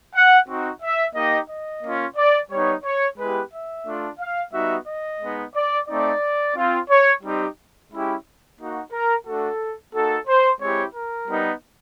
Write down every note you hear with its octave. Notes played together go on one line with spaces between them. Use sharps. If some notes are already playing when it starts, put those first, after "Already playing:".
F#5
C4 D#4 F#4
E5
A#3 D#4 G4 D#5
D#5
A#3 C#4 F4
D5
G3 B3 D#4 C#5
C#5
G#3 B3 E4 G4 B4
E5
A3 D4 F4
F5
G3 B3 D#4 F#4 E5
D#5
G#3 B3 D#4
D5
A3 C4 D#4 D5
C4 F4
C#5
G3 C4 D#4 G4
G#3 C#4 E4 G4
A#3 D#4 F#4
A#4
A3 D4 F#4 A4
A#3 D#4 F#4 A4
C5
G#3 C4 E4 G4 C#5
A#4
G3 B3 D#4